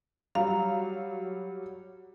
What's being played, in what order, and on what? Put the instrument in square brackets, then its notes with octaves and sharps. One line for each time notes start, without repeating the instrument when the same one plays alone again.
[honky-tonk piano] F#3 G3 [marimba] F5 A#5